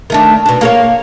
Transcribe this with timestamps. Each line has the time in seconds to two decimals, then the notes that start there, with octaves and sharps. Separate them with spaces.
0.10 D#3 A3 D4
0.46 B2 D4
0.61 A#3 A4 C#5